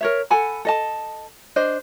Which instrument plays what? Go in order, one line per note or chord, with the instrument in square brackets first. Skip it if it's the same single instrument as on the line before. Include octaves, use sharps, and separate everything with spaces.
[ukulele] A#4 C#5 E5
A4 F#5 G#5 B5
A4 D#5 A5
D4 C5 D#5